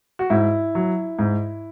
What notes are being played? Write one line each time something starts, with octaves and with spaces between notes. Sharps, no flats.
F#4
G#2 E4
F#3
G#2